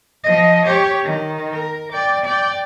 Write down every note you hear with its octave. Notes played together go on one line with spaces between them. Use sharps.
F3 D#5
G4 C#5
D#3
A#4
D5 G5
D5 G5